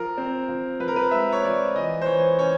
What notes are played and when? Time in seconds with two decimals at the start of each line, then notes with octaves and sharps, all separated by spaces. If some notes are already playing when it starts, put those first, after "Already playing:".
Already playing: F3 A#4
0.17 C4
0.48 F3
0.80 F3 B4
0.88 A#4
0.96 B4
1.11 G#3 E5
1.32 C#5
1.44 F3 D5
1.74 E3 D#5
2.02 C5
2.06 E3 C#5
2.38 C#4 C#5